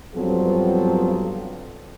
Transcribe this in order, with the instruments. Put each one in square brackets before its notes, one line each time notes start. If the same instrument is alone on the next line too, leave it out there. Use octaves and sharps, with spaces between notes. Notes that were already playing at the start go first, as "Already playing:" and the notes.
[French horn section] G2 F3 F#3 B3 C4 A4